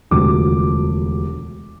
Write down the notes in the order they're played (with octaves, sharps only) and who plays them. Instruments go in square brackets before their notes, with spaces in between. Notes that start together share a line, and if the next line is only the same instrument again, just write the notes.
[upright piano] E1 D2 C3 F3 D6